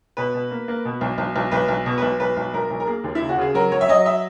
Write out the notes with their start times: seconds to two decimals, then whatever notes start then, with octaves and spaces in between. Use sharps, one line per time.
0.17 B2 B4
0.34 B2
0.51 A#3
0.68 A#3
0.85 B2
1.01 B1
1.18 B1
1.36 B1
1.52 B1 B4
1.68 B1
1.86 B2
1.98 B1 B4
2.20 B1 B4
2.37 B1
2.54 B1 A#4
2.70 B1
2.80 A#4
2.87 A#3 G#4
3.04 D#2
3.15 E4
3.21 C#3
3.29 F#4
3.38 C#3 G#4
3.54 F#3 A#4
3.72 F#3 C#5
3.81 E5
3.89 F#3 D#5
4.06 E5